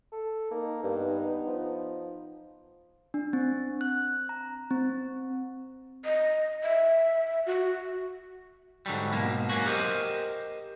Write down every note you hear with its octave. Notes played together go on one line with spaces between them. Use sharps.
A4
A#3 D#4
G2 B3 D#4
F3
D4
C4
F#6
A#5
C4
D#5
E5
F#4
G#2 D3 F#3 G3
G#2 B2 A#3
F#2 A#3 C#4 F#4
G4 A#4 C5 D#5